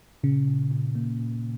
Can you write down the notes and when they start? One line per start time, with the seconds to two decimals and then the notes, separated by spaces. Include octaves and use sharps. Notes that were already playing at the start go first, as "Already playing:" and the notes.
0.23 A#2 C#3
0.48 A#2
0.72 A#2
0.95 A#3
1.20 A#2